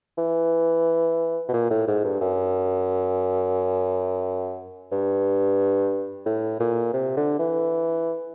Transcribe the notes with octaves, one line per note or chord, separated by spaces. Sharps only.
E3
B2
A#2
A2
G#2
G2
F#2
G2
A2
A#2
C3
D3
E3